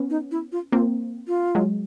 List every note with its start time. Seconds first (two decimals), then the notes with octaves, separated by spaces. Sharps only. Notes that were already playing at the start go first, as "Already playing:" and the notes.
Already playing: B3 C#4
0.10 D#4
0.31 E4
0.52 F4
0.72 A#3 C4 F4
1.28 F4
1.55 F#3 G#3